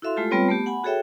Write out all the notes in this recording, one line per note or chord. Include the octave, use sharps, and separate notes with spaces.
E4 F#4 A4 E5 F5 C6
G#3 A3 F4 G4 A4
G3 B3 C4 F4 B4 C#5
A3 B3 G4
F#5 G#5 B5
F#4 G#4 A4 C#5 E5 G5